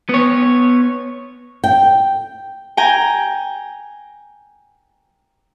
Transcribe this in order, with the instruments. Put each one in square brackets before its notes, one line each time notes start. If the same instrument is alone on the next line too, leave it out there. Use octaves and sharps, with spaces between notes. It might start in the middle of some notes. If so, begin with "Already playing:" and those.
[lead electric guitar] B3 C#5
[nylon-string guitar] G5
[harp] G5 G#5 A#5